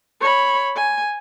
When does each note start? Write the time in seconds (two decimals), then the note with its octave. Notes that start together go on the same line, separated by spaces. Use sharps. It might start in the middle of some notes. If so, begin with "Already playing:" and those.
0.20 C#5 B5
0.76 G#5